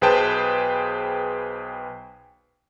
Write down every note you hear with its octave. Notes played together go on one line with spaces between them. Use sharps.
B1 G#4 B4 C5 G5 A5